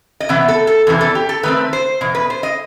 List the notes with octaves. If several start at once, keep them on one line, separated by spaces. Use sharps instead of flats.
D#5
C3 E3 B3 E5
A4
A4
E2 C3 E3
A4
G4
A4
D#3 A3 C4 B4
C5
E2 B2
B4
C5
D#5